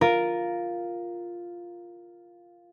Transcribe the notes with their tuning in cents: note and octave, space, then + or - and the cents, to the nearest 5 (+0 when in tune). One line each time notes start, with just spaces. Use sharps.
F4 +0 A#4 +0